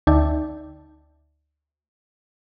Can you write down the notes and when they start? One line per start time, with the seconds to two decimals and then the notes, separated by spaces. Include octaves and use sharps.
0.07 D2 D#4 D5 E5 G5 A5